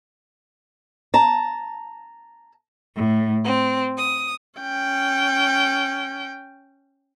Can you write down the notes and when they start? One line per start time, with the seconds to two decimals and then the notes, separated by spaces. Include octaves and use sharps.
1.14 A5 A#5
2.97 A2
3.44 C4
3.97 D#6
4.60 C#4 G5